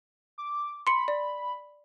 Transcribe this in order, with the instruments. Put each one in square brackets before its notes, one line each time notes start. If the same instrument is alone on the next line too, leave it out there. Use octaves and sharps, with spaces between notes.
[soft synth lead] D6
[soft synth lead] B5 [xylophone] C6 C#7
[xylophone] D5